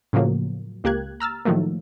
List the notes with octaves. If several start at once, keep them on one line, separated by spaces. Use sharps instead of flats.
A2 C#3 F3 F#3 A#3
C#2 A#3 G4 F#6 G#6
A#5 E6 F6 A6
A2 D#3 F3 F#3 A3 A#3